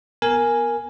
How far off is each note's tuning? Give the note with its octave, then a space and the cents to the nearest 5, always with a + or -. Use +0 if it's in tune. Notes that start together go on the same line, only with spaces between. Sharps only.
B3 +0 A#4 +0 G#5 +0